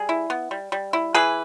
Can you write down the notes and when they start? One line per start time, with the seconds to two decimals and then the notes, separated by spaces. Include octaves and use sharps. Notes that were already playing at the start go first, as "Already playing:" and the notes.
Already playing: G3 G#4
0.09 E4
0.30 B3
0.51 G3
0.72 G3
0.93 E4
1.14 E3 G#4 B4